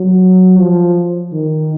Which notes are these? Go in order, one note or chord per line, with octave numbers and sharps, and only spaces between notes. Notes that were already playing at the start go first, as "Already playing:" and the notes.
Already playing: F#3
F3
D#3